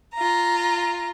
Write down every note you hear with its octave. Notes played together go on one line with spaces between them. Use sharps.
F4 A#5